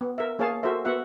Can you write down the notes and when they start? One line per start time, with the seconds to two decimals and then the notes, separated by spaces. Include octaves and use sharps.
0.01 B3
0.18 A#4 E5
0.39 A#3 G#4 C#5 F5 A5
0.63 F#4 A4 A#4 C5 E5
0.85 B3 F#4 E5 F#5